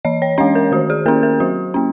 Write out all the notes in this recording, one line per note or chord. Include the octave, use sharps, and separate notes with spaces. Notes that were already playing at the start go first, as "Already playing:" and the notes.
E3 D#5
C#5
G#3 C#4 D#5
A#4
D#3 F#4
G#4
A#3 C#4 A#4
A#4
F#3 F#4
A#3 C#4